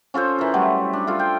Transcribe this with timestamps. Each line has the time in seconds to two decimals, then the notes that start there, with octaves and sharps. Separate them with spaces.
0.14 C#4 F4 A4 C5
0.39 E3 A#4
0.54 F#3 G3 A3 E4
0.93 D4
1.07 F4 A4 F5
1.20 G5